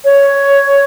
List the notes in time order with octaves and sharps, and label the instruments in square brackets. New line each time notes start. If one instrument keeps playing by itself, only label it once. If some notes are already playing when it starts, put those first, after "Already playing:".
[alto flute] C#5